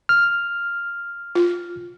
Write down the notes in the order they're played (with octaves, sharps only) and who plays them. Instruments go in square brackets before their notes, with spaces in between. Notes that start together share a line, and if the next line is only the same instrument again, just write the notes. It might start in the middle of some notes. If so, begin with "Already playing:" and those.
[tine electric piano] F6
[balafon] F4